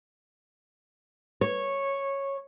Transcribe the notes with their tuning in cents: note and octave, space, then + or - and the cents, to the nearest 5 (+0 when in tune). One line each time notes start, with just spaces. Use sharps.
C#5 -10